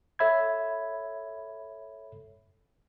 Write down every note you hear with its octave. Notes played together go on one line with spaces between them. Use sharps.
A4 C#5 E5 B5 G#6